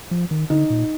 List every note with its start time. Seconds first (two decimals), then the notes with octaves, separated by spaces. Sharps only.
0.11 F3
0.31 D#3
0.50 D3 D#4
0.70 A#2